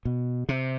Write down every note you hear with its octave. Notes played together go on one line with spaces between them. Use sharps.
B2
C3